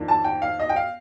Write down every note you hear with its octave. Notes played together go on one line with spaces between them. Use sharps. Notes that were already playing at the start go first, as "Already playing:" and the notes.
Already playing: F2 D#3 A#3 D4
A5
G5
F5
D#5
G5
F5